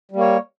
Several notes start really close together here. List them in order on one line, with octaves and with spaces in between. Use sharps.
G3 A#3 C#5